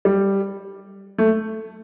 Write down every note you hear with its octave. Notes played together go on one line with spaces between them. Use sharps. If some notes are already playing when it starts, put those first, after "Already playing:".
G3
A3